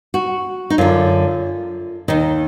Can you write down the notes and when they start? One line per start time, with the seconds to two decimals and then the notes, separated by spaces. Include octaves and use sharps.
0.14 F#4
0.70 D#4
0.78 F#2 D3 F4
2.08 D#2 D#3 D#4